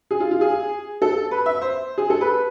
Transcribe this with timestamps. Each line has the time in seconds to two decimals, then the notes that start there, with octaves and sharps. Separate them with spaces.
0.11 G#4
0.20 F4
0.31 F4
0.41 G#4
1.02 A4
1.31 B4
1.46 E5
1.62 C5
1.98 G#4
2.10 A4
2.21 B4